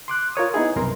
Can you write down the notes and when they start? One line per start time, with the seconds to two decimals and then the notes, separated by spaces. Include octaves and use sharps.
0.08 C6 D6 F#6
0.36 F4 A#4 C#5 D#6
0.54 B3 D#4 E4 G#4
0.76 C2 F#2 B2 A#4 A#5 C6